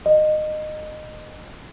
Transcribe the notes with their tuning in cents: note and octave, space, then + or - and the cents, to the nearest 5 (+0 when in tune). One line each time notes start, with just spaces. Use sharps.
D#5 -20